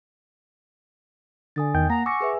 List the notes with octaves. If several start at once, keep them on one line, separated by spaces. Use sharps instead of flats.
D3 G#5 D#6 A6
E2 D#3 G5 G6
A#3 F#5 A#5
G#5 C#6 D6 E6 A#6
G#4 B4 E5